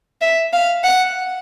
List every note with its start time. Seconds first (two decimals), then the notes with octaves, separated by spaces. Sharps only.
0.21 E5
0.53 F5
0.84 F#5